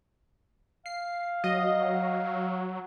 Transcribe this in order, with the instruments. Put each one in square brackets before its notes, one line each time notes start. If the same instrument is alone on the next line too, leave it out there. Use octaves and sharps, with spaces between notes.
[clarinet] F5 [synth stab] C7
[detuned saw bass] F#3 [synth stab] D#5